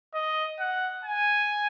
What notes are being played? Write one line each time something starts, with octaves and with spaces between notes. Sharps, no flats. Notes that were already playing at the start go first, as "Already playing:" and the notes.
D#5
F#5
G#5